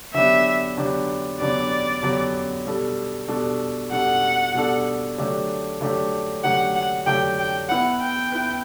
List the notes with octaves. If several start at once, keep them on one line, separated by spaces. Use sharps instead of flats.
D3 F#3 B3 D4 G4 E5
D3 F#3 B3 D4 G4
D3 F#3 B3 D4 G4 D5
D3 F#3 B3 D4 G4
B2 G3 D4 A4
B2 G3 D4 A4
B2 G3 D4 A4 F#5
B2 G3 D4 A4
D3 F#3 A3 D4 G4
D3 F#3 A3 D4 G4
D3 F#3 A3 D4 G4 F#5
F#5
D3 F#3 A3 D4 G4 G5
G5
B3 E4 B4 F#5
G5
B3 E4 B4